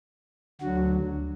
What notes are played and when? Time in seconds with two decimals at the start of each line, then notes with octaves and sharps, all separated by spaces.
0.61 D2 D3 F#3 F#4